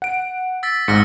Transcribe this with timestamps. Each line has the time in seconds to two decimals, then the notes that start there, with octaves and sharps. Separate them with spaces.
0.02 F#5 D7
0.63 E6 A6 B6
0.88 G#1 G#2 F6 A#6 C#7